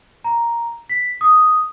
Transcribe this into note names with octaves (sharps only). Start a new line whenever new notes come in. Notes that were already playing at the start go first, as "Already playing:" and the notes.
A#5
B6
D#6